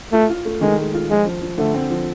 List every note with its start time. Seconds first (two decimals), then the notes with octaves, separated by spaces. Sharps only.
0.13 A3 F4
0.29 F4
0.45 A3
0.61 D#3 G#3
0.78 G#3
0.94 F4
1.10 F3 G#3
1.26 F3
1.42 F3
1.58 D3 A3
1.74 C4
1.90 F3